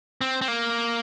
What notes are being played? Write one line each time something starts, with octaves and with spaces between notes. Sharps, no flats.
C4
C4
A#3